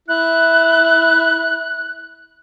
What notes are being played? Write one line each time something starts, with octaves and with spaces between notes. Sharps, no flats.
E4 F#6